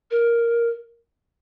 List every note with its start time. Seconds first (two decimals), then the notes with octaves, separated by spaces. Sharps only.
0.10 A#4